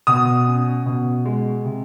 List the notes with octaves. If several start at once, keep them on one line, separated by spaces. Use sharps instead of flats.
B2 D#6
C#4
B2
G#3
C3